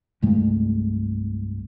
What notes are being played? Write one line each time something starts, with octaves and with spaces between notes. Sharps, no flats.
C2 G2 G#3 A3